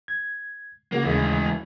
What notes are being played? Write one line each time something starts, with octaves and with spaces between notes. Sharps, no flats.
G#6
C#3 A#3 F#4
D#2 C#3 E3 G#3 A3